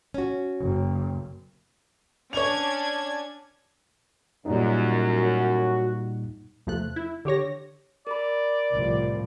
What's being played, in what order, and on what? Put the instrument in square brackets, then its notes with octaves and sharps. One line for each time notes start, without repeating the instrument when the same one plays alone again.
[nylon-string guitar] C#4 F#4
[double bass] F#1
[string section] C#4 D4 G#6 [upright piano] C#5 F7
[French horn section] F#2 [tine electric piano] A#2 G3 D#4
[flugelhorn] F#4
[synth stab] E2 C3 F3 A3 F#6
E4
D3 G4 C#5 A#6
[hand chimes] A#4 B5 [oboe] D5
[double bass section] C2 A2 F3